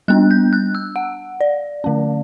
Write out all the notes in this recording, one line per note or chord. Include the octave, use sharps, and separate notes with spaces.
G3 B3 D4 F#6
G6
F#6
E6
F#5
D5
D3 A3 C#4